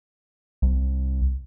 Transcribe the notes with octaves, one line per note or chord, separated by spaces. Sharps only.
C2